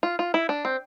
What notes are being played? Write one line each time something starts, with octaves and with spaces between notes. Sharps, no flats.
F4
F4
E4
D4
C4